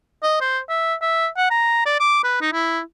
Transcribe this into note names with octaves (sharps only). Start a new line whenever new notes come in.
D#5
C5
E5
E5
F#5
A#5
D5
D6
B4
D#4
E4